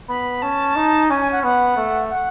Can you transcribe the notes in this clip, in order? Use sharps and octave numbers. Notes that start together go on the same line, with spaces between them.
B3 B5
C#4 A5
D#4
C#4 G#5
G#5
F#5
B3 F#5
A3
F#5